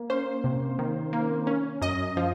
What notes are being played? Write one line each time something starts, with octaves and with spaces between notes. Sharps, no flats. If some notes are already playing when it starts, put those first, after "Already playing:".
Already playing: A#3
C#4 C5
C3
D#3
A#3
C#4
F#2 D#5
F3